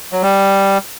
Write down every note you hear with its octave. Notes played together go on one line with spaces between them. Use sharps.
F#3
G3